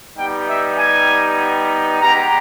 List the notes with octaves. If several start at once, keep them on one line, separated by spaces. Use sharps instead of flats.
G3 B3 D#4 G4 G5
E5
G#5
G#3 B3 G4 A#5